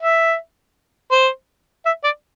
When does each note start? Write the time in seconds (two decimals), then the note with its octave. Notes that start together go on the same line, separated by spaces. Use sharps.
0.01 E5
1.11 C5
1.86 E5
2.04 D5